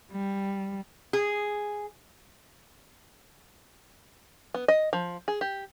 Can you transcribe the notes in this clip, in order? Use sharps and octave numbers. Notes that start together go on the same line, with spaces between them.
G3
G#4
B3
D#5
F3
G#4
G4